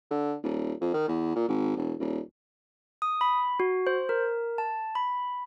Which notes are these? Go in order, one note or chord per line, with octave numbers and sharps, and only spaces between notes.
D3
D#1
F2
D#3
E2
A#2
G#1
E1
D#1
D#6
B5
F#4
C5
A#4
A5
B5